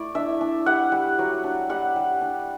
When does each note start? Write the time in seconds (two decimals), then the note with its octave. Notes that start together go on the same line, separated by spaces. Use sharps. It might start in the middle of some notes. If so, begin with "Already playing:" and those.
Already playing: A3 E4 D5
0.15 D4 E5
0.41 D4
0.66 G3 F#5
0.92 G3
1.19 F#3
1.44 D4
1.69 G3 F#5
1.96 G3
2.21 D4